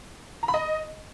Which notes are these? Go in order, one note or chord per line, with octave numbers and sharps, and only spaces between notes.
A#5
B5
D#5